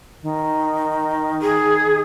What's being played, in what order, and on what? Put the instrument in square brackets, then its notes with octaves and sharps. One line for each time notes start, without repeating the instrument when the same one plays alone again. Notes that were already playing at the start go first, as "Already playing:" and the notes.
[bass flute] D#3
[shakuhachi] G#4